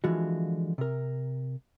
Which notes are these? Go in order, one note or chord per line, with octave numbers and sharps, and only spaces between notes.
D3 E3 F3 G#3 F4 F#4
C3 A#4